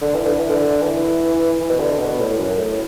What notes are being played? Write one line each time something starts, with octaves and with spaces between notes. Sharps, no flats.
D3
E3
D3
E3
D3
E3
E3
B2
D3
B2
A2
F#2
A2